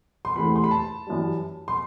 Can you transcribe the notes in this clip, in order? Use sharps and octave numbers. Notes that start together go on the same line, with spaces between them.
C6
E2 C3 E3 A3 B5
C6
B5
A5
F#2 E3 G3
C6